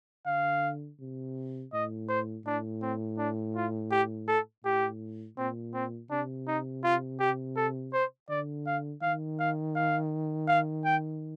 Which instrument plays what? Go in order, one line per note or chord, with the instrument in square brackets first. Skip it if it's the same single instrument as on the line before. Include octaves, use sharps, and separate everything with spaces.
[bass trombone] D3 [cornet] F5
[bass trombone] C3
[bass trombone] A2 [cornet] D#5
[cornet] C5
[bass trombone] A2 [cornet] D4
[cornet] C4
D4
F4
G4
A4
[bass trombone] A2 [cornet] G4
[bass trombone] A#2 [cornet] C4
[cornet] C4
[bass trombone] C3 [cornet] D4
[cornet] D#4
F4
G4
A4
C5
[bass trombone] D3 [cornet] D5
[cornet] F5
[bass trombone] D#3 [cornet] F5
[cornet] F5
F5
F5
G5